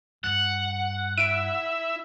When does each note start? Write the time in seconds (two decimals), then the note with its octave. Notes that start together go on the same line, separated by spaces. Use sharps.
0.24 G2 F#5
1.18 E4 E5 D7